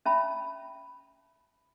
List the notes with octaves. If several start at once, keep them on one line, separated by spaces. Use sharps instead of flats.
C#4 E5 A5 B5